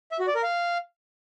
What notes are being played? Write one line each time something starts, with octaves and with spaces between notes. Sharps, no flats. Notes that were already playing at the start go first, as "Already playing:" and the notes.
E5
F#4
D5
A#4
F5